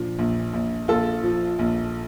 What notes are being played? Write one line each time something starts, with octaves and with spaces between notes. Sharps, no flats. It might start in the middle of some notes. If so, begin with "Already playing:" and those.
Already playing: A#2 F3 D4
A#1
A#1
A#1 F4 A4
F3
A#1